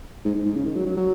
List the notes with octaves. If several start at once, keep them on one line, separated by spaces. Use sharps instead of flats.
G#2
G#2
G#2
C#3
D#3
F#3
F#3
F#3